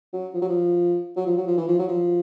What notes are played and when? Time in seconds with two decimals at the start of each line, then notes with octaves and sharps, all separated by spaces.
0.13 F#3
0.34 F3
0.42 F#3
0.48 F3
1.16 F#3
1.26 F3
1.37 F#3
1.47 F3
1.57 E3
1.67 F3
1.79 F#3
1.88 F3